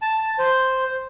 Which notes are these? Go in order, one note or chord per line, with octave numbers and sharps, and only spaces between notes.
A5
C5